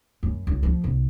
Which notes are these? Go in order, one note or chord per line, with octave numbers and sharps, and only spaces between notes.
F#2
C#2
F3
C2